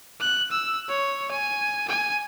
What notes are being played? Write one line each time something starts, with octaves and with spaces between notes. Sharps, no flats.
F#6
E6
C#5
G#5
G#5